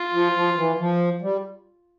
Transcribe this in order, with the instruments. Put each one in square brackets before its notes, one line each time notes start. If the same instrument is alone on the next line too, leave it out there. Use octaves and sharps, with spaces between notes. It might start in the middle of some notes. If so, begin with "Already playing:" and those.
Already playing: [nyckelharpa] F4
[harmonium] F3
F3
E3
F3
G3